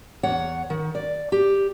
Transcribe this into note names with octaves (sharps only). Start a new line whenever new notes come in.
E2 C#5 F#5
D#3
D5
G4